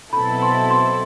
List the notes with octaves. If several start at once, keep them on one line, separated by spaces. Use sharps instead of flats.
B2 F#3 C4 E4 A4 B5
C6
C6